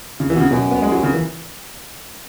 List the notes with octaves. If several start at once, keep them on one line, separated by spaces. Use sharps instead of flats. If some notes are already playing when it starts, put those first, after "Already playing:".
C#3
E3
B2
C#3
F#2 B2
B3
G#3
F#3
C#3
E3